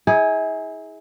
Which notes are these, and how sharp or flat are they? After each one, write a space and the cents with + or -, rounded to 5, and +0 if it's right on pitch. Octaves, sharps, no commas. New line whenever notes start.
E4 -40 G#4 +0